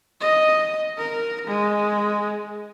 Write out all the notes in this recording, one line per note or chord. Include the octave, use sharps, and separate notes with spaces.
D#5
A#4
G#3